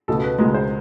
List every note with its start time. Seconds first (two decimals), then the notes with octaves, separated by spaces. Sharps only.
0.08 C#2 B2 G#3 A4
0.24 B4
0.39 C#2 B2 G#3 A#4
0.54 C5